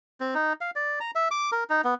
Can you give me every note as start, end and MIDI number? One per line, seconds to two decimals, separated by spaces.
0.20 0.34 60
0.35 0.53 63
0.61 0.71 77
0.76 0.99 74
1.00 1.11 82
1.15 1.28 76
1.31 1.51 86
1.52 1.64 70
1.70 1.81 63
1.84 1.94 59